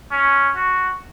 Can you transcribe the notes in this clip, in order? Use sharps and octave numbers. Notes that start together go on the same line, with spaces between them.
C#4
F#4